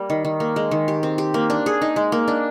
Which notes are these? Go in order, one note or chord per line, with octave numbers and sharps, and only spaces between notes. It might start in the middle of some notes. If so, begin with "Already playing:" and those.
Already playing: G3 A#3
D#3
D#3
A#3
G#3
D#3
G4
C4
G4
A#3
D4
G#4
D#4
G#3
A#3
D4